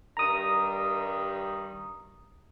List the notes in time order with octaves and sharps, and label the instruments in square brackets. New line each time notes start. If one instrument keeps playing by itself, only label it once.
[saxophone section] G2 D#3 G3 [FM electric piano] A#5 D#6